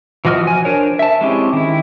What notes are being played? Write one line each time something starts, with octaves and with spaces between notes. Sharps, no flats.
E3 F3 F#4 D#5 F6
G#5
D4 A#4 C5 C#5
E5 A5
G#3 C4 C#4 E4 G4
D#3 E4